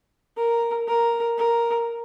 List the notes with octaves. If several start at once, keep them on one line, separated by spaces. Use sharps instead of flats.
A#4
A#4
A#4